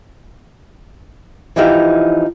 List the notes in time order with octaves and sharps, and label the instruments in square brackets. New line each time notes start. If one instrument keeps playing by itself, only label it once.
[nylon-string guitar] E3 F3 D#4 E4 G4 F5